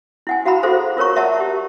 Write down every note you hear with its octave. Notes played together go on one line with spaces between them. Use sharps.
E4 F#5 G#5
F#4 F5 F#5 A#5 B5
F4 F#4 G#4 A4 C5 F5
F4 A#4 C#5 A#5 C#6
A#4 D5 E5 F#5 A5 A#5
G4